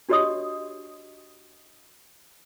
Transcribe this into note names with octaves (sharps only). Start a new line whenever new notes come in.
D4 F#4 G4 C#5 D#5 D#6